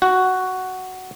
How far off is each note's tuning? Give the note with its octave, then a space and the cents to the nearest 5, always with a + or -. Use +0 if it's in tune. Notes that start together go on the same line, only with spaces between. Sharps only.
F#4 +5